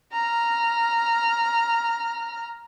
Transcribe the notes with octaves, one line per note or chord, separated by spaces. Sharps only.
A#5 F6